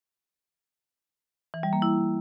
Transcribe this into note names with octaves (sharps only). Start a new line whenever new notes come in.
E3
G3
A#3
E4